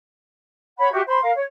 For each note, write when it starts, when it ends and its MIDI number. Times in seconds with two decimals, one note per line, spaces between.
0.78 0.89 73
0.78 0.89 78
0.78 0.89 83
0.91 1.01 66
0.91 1.01 67
0.91 1.01 76
1.07 1.19 72
1.07 1.19 83
1.07 1.19 84
1.22 1.31 70
1.22 1.31 77
1.35 1.43 73